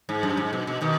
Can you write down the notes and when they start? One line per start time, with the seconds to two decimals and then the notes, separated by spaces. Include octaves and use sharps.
0.09 G#2
0.23 F#2
0.37 G#2
0.53 B2
0.67 B2
0.82 B2 D#3